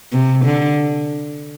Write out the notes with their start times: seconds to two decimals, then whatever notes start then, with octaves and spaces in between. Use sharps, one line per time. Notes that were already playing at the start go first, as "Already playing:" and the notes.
0.12 C3
0.44 D3